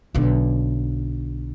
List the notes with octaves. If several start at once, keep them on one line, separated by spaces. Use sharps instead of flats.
B1 D3